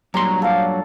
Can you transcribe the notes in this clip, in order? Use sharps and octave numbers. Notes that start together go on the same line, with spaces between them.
G2 A#2 F#3 A#5 C6
A4 D5 F5